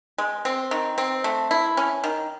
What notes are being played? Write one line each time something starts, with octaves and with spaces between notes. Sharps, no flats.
G#3
C4
D#3
C4
A3
E4
C#4
D#3